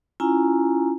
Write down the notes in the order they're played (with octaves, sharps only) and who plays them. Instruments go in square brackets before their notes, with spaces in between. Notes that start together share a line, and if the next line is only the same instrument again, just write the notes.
[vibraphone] C#4 E4 F4 G#5 A#5